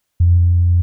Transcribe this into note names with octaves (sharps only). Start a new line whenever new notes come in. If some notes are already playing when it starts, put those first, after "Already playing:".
F2